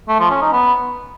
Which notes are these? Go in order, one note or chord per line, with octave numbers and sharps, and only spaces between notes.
A3
F3
C#4
D#4
B3